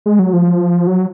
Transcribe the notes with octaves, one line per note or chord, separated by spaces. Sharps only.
G#3
F#3
F3
F#3